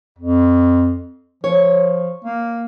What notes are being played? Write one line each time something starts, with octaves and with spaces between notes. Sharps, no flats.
F2
F3 C#5
A#3